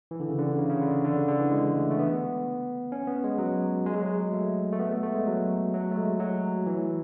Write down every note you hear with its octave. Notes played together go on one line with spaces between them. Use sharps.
E3
D3
C#3
D3
C#3
C#3
D3
D3
C#3
D3
E3
G#3
A3
A3
B3
C#4
B3
G#3
F#3
G#3
F#3
G#3
A3
A3
B3
A3
A3
G#3
F#3
F#3
A3
G#3
F#3
E3